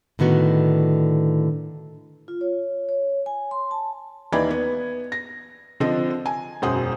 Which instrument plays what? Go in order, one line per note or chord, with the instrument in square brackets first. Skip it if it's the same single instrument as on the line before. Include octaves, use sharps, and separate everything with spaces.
[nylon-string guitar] A2 D3 D#3 B3 F#4
[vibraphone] F4
C#5
C#5
G#5
C6
A5
[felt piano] D#2 E3 D#4 D5 B5 G#6
B3
A#6
D3 F3 C4 D#5
G#5
E1 F#2 C5 F#5 D#6